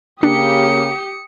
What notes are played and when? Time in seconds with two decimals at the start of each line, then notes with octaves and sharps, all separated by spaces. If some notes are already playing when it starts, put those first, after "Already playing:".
0.23 C#3 A#3 D4 G4 D#6 C#7